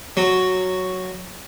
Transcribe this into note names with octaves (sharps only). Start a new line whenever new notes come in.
F#3